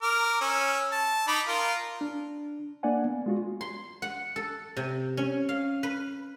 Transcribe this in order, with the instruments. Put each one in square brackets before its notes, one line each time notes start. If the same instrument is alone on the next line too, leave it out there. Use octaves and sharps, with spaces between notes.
[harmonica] A#4 D6 F6
C#4 E6
A5
D#4 B5 D6
F4 A#4
[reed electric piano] D4
A#3 D4 D5 F#5 G#5
B3
G#3 F4 F#4
[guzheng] C6
F#5
A4
C3
C#4
F5
B4